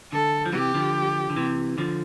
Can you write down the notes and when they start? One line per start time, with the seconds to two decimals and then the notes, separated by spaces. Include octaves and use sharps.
0.12 D3 A4
0.46 F3
0.53 C3 E3 G4
0.74 D3 F3
1.30 D3
1.36 C3 E3
1.78 D3 F3